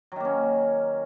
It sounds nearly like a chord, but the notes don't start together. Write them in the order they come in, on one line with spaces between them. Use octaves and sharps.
F#3 D#3 A#3 C#4